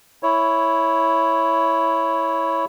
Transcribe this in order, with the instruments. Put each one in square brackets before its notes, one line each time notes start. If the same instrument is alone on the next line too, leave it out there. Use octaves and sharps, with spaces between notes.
[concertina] E4 C#5